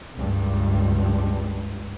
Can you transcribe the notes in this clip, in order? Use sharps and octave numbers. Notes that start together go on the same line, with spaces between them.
C#2 G2